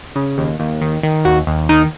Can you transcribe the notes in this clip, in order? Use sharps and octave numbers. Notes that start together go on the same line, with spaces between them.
C#3
D#2
D#2
D#3
D#3
D#2 F#4
D#2
D#3 D#4